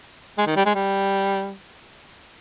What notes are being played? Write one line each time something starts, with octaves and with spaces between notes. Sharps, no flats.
G#3
D#3
G3
G#3
G3